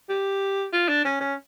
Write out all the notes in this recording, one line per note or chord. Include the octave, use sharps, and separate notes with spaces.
G4
F4
D4
C#4
C#4